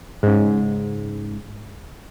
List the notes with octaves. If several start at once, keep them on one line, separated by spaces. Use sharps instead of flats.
G#2 C#3